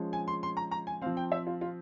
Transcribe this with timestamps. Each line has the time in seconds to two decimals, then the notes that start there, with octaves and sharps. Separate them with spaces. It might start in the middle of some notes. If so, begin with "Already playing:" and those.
Already playing: F3 G#3 C#4
0.13 G#5
0.28 C6
0.43 C6
0.57 A#5
0.71 A#5
0.87 G#5
1.02 C4 F5
1.06 F3
1.17 G5
1.32 E5
1.47 F4
1.61 F4